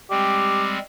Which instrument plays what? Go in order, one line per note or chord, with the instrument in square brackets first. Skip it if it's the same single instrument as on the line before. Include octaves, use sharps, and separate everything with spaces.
[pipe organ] G3 G#3 C4 [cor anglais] G4